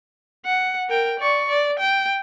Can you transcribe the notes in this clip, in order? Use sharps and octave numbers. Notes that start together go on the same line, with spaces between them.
F#5
A#4 G5
D5 C#6
D5
G5